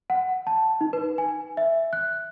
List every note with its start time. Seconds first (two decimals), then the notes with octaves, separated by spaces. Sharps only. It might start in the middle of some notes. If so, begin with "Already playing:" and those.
0.10 F#5
0.47 A5
0.81 D#4
0.93 B4
1.18 G#5
1.57 E5
1.93 F#6